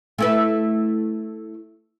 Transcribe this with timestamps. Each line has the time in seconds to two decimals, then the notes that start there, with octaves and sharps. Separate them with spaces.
0.19 A3 E4 B4